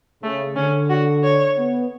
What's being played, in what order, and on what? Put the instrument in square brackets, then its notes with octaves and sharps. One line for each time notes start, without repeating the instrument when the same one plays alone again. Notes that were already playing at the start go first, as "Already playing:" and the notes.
[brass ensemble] C#3 [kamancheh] A3
[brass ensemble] D3 [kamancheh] C#4
[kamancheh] F#4
C#5
[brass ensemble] B3